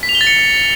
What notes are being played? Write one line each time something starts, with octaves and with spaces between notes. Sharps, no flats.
B6
F7
G7
A6
C#7